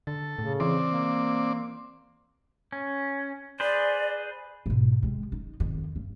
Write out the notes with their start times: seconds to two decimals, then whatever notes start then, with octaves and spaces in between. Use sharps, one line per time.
0.07 D3 A4
0.39 A2 C#3
0.60 E3 C4 D5
0.89 A#3
2.72 C#4
3.60 G#4 B4 C5 D5
4.66 G#2 B2
5.02 C3 G#3
5.32 D#4
5.60 F2 D#3
5.96 G2